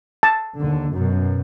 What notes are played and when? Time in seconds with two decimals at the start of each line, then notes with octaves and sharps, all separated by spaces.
0.23 A5
0.59 D#2 D3
0.91 F#2 B2